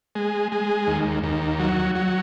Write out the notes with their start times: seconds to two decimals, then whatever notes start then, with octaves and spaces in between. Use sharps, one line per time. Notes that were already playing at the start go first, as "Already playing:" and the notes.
0.15 G#3
0.52 G#3
0.87 D#2
1.23 D#2
1.60 F#3
1.95 F#3